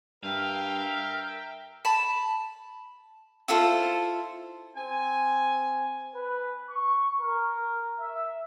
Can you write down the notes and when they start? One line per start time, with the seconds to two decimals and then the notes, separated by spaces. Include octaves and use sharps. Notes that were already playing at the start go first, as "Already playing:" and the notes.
0.23 G2 A#4 E5 F5 G5
1.85 A5 B5
3.48 E4 F4 A4 C5
4.77 C4 G#5
6.16 B4
6.70 C#6
7.21 A#4
8.00 E5